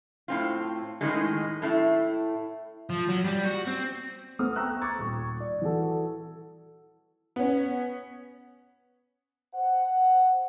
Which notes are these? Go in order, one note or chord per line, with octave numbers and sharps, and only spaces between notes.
A2 C4 F4
A2 D#3 G#3
A2 A3 E4
F3
F#3
G3
F#4
C4
A3 B3 C5 D#6 F6
G5 A#5 C#6 E6 F#6
C#6 D6 G#6 A6
D#1 C#6
D5
E3 F#4 A4
B3 C#4
C5 F#5